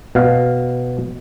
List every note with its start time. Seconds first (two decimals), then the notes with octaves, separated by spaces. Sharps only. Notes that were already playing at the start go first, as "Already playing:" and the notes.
0.15 B2 F5